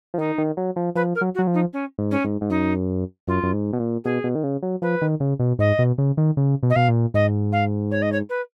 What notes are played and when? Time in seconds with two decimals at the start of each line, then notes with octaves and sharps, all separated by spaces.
0.14 F3
0.18 D#3 D#4
0.38 D#3
0.57 F#3
0.76 F3
0.95 F3 B4
1.15 A#4
1.21 F#3
1.34 F#4
1.39 F#3
1.47 F3
1.54 D#4
1.73 C#4
1.98 G#2
2.11 C#4
2.24 G#2
2.41 G#2
2.50 F#2 D#4
3.27 F#2 F4
3.43 F#2
3.53 G#2
3.73 B2
3.79 A#2
4.04 B2 G#4
4.24 B2
4.35 D#3
4.43 C#3
4.62 F#3
4.82 F3 B4
5.02 D#3
5.20 C#3
5.39 B2
5.59 G#2 D#5
5.79 B2
5.98 C#3
6.17 D#3
6.37 C#3
6.63 B2
6.70 D#5
6.75 B2 F5
6.88 A#2
7.14 G#2 D#5
7.52 F5
7.91 C#5
8.02 D#5
8.12 C#5
8.29 B4